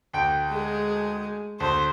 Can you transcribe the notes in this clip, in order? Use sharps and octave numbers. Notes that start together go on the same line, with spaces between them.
D2 G5
G#3 G#4
D2 C5